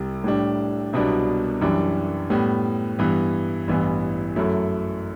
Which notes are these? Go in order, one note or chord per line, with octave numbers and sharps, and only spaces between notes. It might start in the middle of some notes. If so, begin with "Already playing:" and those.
Already playing: C2 C3 G3
A2 G3 D4
C2 B2 F#3 B3 D4
F#2 E3 G3 D4
A2 G3 B3
G2 E3 B3
A1 G2 E3 B3
F#2 F#3 A3 E4